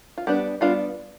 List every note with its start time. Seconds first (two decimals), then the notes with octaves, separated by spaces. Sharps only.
0.18 F4
0.27 G3 B3 D4 G4
0.61 G3 B3 D4 F4